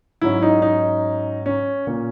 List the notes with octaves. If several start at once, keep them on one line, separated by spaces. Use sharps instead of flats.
G#2 F#3 C#4 E4
D#4
D#4
C#4
A#2 A#3 C#4